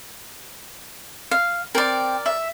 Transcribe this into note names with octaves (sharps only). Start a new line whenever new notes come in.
F5
C4 A#4 D5
E5